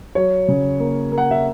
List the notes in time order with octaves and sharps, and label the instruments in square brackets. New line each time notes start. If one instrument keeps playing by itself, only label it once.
[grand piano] F#3 C#5
C#3
A#3
A#3
F#5
E5